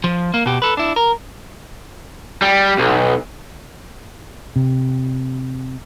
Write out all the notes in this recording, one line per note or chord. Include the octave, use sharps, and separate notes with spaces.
F3
A#3
B2 G4
A4 B4
D4 E4
A#4
G3
B1
C3